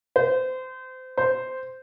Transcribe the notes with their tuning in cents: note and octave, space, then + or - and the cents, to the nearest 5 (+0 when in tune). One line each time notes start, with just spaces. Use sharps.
C5 -30
C5 -10